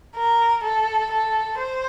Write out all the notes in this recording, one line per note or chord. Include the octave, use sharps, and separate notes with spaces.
A#4
A4
A4
C5